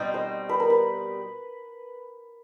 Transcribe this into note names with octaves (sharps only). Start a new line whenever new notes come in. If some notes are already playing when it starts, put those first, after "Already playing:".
Already playing: B2 G3 C4 D#4
C5
B4
A#4
B4